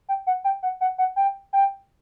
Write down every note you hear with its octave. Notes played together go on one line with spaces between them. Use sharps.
G5
F#5
G5
F#5
F#5
F#5
G5
G5